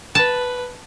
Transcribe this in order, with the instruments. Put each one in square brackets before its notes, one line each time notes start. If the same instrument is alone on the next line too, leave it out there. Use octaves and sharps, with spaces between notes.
[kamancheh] B4 [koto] A5